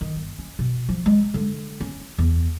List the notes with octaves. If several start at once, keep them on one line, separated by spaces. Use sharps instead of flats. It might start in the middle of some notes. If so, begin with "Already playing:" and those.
D#3
G1
C#4
B2
F3
G#3
D3
C#4
E2